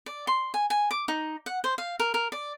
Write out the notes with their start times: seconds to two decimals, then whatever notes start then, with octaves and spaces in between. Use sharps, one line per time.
0.06 D5
0.27 C6
0.54 G#5
0.70 G#5
0.91 D6
1.08 D#4
1.46 F#5
1.64 C5
1.78 F5
1.99 A#4
2.14 A#4
2.32 D5